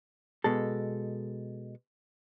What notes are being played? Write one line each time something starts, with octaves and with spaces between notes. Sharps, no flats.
B2 G#3 A4